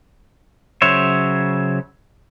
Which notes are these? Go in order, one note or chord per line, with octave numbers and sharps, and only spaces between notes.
C#3 F#3 C5 C#5 E5